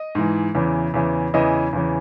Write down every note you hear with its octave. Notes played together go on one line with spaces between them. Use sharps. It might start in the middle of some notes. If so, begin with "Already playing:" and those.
Already playing: D#5
G#2 E3
E2 C#3 E3
E2 C#3 E3
E2 C#3 E3 D#5
E2 C#3 E3